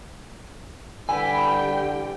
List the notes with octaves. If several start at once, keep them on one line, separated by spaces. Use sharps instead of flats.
D3 G3 E4 B4 G5 G#5